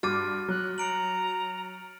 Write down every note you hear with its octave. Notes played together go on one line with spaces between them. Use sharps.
G2 F#4 D6 F6 A6 D#7
F#3 F#6
A#5 C#7 D7 F#7